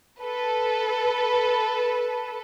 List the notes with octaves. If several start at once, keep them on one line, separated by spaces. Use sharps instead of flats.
A4 B4